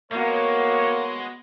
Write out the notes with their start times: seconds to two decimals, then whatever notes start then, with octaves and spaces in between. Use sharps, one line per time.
0.12 G#3 A#3 B3 F#4 C#5